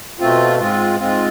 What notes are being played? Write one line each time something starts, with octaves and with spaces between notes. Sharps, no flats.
B2 A3 C4 F4
G#2 G#3 C4 F4
G#2 G#3 C4 F4